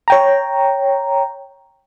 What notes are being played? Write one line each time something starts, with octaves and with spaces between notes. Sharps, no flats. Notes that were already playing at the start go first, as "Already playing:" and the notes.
C#5 G5 A#5